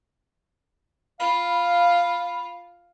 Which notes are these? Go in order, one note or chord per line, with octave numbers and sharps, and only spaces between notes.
F4 F5 B5